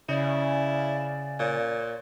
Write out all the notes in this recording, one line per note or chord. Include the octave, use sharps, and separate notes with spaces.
C#3 C#4 E4 D5
A#2 C#5